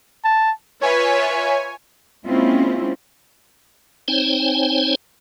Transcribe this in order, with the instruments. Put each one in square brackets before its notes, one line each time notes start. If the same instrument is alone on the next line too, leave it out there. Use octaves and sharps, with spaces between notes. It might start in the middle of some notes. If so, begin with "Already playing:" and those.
[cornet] A5
[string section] F4 B4 E5 [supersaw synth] C#5 G#5
[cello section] G#3 A#3 C4 C#4 E4 F4
[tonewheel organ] C4 D#4 C5 C#5 G5 G#5